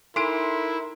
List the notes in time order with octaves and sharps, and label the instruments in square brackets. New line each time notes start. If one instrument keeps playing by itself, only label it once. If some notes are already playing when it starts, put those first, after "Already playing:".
[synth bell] D#4 A4 [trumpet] E4 [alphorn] A#4 [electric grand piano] C6 D7